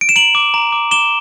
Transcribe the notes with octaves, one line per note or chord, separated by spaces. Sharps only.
D7
E7
A#5 D7 F#7
D6
A#5
D6
D6 E7 G7